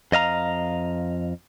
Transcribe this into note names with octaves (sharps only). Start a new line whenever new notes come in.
F2 D#5 F5 A#5